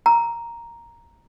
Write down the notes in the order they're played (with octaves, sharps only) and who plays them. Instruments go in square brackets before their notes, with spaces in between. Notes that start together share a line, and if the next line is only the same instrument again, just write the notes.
[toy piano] A#5